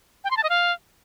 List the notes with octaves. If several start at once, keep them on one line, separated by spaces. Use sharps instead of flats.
G5
C6
A5
D#5
F5